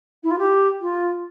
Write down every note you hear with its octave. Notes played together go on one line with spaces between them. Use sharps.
E4
F4
G4
F4